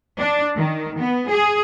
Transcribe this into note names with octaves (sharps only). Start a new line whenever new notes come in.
D4
D#3
B3
G#4